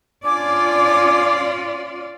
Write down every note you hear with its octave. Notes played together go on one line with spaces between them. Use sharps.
C#4 D4 F4 D5 G#5 D6